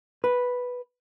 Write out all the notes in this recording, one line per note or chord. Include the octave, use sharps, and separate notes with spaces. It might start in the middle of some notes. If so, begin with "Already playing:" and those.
B4